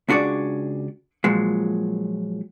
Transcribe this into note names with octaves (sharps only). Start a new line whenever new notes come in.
C#2 D4 F#4 G#4 D5
A#2 F3 F#3 G#3